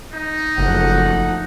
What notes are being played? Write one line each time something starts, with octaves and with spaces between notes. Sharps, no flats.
D#4
F#1 F3 A3 F#5